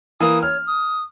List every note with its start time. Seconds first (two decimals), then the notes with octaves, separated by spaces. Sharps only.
0.20 E3 A#3 D#6
0.43 C#5 F6
0.66 D#6